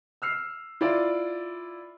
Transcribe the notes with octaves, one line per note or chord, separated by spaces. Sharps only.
E6 F6 C7
E4 F4 D5